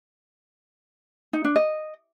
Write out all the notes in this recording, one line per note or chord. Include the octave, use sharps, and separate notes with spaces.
D#4
D4
D#5